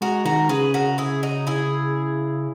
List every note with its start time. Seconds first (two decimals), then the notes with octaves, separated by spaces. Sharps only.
0.01 G#3 F#4 A#4
0.25 D#3 F#4 A#4
0.49 C#3 G#4 B4
0.74 F#4 A#4
0.98 E4 G#4
1.23 D#4 F#4
1.47 E4 G#4